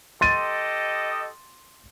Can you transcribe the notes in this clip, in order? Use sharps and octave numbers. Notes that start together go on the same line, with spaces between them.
G4 A4 D#5 C6 A6 D#7